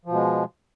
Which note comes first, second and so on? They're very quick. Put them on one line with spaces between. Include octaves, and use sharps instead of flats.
F3 B2 G#3